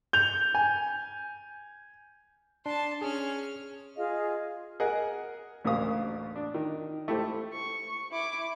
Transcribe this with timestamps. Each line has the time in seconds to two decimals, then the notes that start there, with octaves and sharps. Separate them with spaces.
0.13 G6 F7
0.55 G#5
2.66 D4 A5 C6
3.01 C#4 G#4 F6
3.97 F4 G#4 D#5 F5
4.80 G#4 A#4 D#5 F#5
5.65 A1 D2 C#3 A#3 F5 D#6
6.36 D4
6.54 D#3
7.08 A3 E4 G4 A4 C5
7.53 C#6
8.11 E4 D6